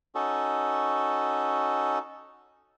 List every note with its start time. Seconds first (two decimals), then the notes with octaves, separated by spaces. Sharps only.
0.15 C#4 D#4 F#4 A4